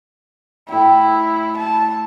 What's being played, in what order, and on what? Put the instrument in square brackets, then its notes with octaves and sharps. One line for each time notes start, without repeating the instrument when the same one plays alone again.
[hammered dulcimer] A2 G5 [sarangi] E4
[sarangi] A5